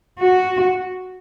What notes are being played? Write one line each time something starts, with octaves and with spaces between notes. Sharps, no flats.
F#4